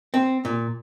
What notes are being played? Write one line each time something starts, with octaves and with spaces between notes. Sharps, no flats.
C4
A#2